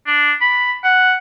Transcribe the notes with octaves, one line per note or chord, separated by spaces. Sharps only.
D4
B5
F#5